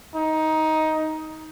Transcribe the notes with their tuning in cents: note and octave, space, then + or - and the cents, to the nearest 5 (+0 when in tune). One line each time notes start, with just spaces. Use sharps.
D#4 +15